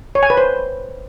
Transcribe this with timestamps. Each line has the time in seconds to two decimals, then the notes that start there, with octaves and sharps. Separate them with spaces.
0.15 C#5
0.23 G#5
0.30 B4
0.37 C5